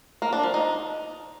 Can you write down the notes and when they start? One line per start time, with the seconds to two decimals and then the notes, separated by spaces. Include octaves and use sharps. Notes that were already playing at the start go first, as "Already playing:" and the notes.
0.22 A#3
0.33 D4
0.43 F3
0.54 D#4